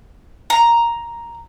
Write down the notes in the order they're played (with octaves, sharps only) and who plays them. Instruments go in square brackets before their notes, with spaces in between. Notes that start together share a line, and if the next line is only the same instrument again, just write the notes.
[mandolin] A#5